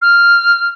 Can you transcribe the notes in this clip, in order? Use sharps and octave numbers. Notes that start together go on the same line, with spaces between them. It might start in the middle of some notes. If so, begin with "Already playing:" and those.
F6